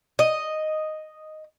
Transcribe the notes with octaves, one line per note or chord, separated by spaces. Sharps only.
D#5